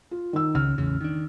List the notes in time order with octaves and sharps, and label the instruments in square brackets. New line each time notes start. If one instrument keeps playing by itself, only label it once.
[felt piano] F4
D#3 E6
[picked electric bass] C#2 C#3 [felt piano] F6
[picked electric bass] A1 E2 C#3
D#3 D4